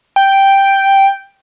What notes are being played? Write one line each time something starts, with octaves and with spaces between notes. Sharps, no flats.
G5